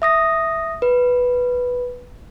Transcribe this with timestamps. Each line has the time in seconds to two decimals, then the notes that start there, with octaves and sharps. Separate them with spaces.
0.02 E5 D#6 A#6
0.82 B4